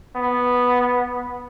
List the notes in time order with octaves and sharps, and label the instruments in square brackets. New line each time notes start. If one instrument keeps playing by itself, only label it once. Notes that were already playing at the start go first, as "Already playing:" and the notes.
[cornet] B3